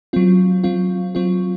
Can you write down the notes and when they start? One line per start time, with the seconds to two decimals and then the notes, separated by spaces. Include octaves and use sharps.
0.13 F#3 C4 F4
0.64 F#3 C4 F4
1.15 F#3 C4 F4